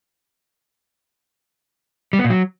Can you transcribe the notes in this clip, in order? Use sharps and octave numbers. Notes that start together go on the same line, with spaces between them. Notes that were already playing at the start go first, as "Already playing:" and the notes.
G3
B3
A#2
F#3